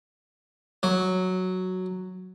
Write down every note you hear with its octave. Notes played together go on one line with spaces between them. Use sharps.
F#3